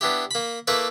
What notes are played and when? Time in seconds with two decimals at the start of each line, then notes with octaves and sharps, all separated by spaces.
0.01 B3 D4 E4 G4
0.31 A#3 B5
0.67 A3 A#3 E4 B4 D5